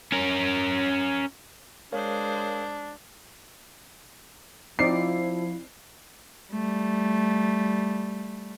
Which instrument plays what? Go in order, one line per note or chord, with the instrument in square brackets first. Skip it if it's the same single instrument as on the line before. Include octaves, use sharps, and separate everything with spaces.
[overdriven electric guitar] C#4 A#4
[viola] G#3 C5 [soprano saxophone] D4 [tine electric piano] A#4 C#5 F5
[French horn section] F3 [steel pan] C4 D#4 D5 [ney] E4 [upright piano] C7
[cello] G3 A3